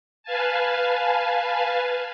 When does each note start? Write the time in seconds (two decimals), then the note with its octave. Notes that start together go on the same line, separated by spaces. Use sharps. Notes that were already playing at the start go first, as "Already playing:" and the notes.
0.23 B4 F5 G#5 A5